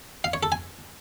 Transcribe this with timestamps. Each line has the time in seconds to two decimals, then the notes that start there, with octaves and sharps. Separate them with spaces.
0.24 F5
0.34 C#5
0.43 A4
0.52 G#5